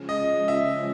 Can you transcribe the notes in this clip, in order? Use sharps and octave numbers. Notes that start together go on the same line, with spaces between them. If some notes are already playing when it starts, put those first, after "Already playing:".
Already playing: C#3 F3 G#3 C#4 F4
D#5
E5